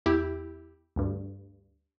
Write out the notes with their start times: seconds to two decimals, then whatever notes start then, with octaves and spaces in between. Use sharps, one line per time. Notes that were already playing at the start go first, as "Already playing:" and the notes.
0.06 E2 E4 G4
0.96 D2 G2